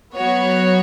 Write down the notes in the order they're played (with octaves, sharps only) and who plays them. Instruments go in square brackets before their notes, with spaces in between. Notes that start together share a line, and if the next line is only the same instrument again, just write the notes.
[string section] F#3 B3 F#4 C#5